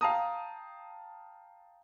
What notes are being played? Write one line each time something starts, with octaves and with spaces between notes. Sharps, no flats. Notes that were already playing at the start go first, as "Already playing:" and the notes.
F5 G5 A5 A#5 D#6